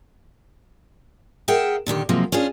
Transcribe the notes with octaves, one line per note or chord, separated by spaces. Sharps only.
G#4 A#4 E5 F#5 G5
A#2 D3 D#3 G4
C3 F3 F#3 G#3 A#3
C#4 D4 F4 G#4